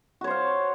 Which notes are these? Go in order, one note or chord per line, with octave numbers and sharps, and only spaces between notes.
F#4 C5 C#5 F5